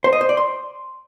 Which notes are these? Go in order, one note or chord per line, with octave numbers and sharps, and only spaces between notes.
C5
D#5
C5
D5
C6